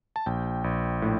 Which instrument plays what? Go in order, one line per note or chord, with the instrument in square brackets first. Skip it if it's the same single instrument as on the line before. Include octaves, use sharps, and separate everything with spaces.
[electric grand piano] A5
A#1 G5
A#1
A2